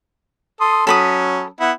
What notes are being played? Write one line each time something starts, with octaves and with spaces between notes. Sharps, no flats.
A4 C6 D#6
F#3 C#4 A4 B5 D#6
B3 E4 F#5